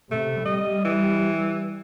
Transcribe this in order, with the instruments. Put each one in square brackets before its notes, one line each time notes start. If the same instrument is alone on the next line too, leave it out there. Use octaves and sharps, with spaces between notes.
[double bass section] C3 [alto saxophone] A3
[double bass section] G3 [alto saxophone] D#5
[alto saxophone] E3